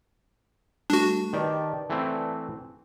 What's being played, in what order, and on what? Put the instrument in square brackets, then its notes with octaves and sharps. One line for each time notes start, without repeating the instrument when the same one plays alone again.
[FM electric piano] G3 A3 [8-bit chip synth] D4 F#4
[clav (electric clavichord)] D#3 G4 [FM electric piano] B4 D5 A5
[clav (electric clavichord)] E3 A3 C4